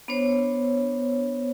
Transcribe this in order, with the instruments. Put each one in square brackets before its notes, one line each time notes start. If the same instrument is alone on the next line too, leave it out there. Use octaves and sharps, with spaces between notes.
[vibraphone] B3 D4 C5 C#5